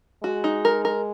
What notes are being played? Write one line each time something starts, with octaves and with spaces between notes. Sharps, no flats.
G#3 F#4
D#4
A#4
A#4